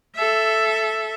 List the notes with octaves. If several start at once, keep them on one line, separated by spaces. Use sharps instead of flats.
A4 E5